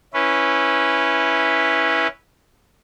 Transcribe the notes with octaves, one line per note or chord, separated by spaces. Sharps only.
C#4 E4 B4